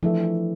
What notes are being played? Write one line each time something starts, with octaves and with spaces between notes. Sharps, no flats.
E3 F3 A3 D4 A4 E5